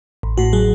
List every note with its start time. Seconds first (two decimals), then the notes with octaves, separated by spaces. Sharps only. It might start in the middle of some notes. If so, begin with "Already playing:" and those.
0.23 A1
0.38 A2 F#4
0.53 F#3 G#4